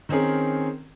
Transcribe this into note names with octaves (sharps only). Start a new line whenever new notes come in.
D#3 C4 C#4 G#4 A#4